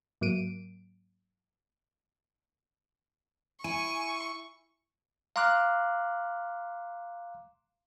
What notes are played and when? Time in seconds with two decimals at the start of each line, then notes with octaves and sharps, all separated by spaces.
0.21 G#2 F#3 A#3 D7 D#7
3.64 E4 G#5 C#6
5.36 F5 A#5 C6 D6 F6 F#6